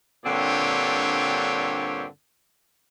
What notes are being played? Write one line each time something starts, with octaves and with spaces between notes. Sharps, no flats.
G2 A#2 D3 C4 G4 C#5